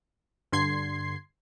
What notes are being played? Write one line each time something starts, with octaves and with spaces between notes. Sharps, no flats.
G2 D3 C6 G#6 C7